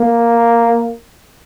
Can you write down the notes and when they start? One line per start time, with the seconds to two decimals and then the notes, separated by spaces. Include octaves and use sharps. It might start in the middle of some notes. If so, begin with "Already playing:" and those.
Already playing: A#3